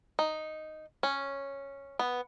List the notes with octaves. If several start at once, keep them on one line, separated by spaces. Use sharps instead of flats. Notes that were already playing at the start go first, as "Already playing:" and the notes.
D#4
C#4
B3